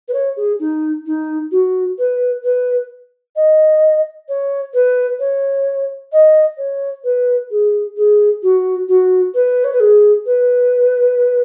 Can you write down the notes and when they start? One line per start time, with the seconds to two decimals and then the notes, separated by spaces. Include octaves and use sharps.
0.08 B4
0.13 C#5
0.37 G#4
0.60 D#4
1.06 D#4
1.52 F#4
1.98 B4
2.44 B4
3.36 D#5
4.29 C#5
4.74 B4
5.20 C#5
6.13 D#5
6.58 C#5
7.04 B4
7.51 G#4
7.97 G#4
8.43 F#4
8.89 F#4
9.34 B4
9.64 C#5
9.73 B4
9.80 G#4
10.26 B4